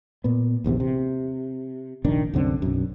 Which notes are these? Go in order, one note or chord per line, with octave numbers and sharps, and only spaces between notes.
A#2 B3
D#1 A#1 E2 C3
C3
F1 A#1 D#3 D4
C2 F#2 D3 C4
B1 F#2